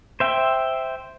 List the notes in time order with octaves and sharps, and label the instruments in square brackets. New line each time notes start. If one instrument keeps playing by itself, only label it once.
[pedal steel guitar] C5 E5 G5